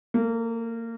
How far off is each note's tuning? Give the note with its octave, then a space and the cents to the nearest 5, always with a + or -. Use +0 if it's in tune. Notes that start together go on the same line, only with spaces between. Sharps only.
A#3 -25 A4 +0